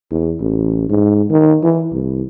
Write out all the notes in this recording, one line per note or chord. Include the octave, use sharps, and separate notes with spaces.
E2
A1
G#2
D#3
E3
C2